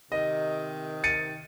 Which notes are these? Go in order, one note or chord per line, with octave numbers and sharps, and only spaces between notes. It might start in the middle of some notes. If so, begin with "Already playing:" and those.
C3 D#3 D#5
A6 C#7 D#7